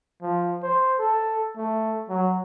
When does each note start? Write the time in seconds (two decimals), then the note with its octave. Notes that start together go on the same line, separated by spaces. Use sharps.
0.22 F3
0.63 C5
0.99 A4
1.57 A3
2.09 F#3